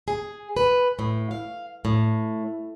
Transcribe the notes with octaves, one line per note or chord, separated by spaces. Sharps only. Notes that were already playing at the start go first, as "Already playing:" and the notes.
G#4
B4
A2
F5
A2